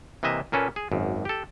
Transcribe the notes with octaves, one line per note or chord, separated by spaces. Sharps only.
C3 E3 A#3 D#5 E5
A#2 A#3 C#4 A4 B4
G#4
G#1 F#2
G4 A4